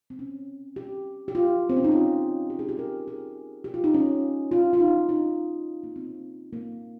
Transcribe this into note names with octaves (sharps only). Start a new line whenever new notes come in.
C4
C#4
G4
G4
F4
C4
C#4
D#4
F4
G4
G#4
G4
A#4
G#4
G4
F4
D#4
C#4
F4
F4
D#4
D#4
A#3
C4
A#3